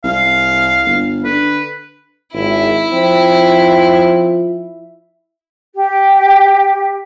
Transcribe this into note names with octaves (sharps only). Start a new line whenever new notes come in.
C2 F5
G1
D3 B4
G#1 E4
F3 C4
G4